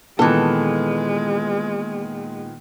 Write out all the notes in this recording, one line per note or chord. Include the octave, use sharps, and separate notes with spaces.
A#2 D#3 E3 G#3 B3 A4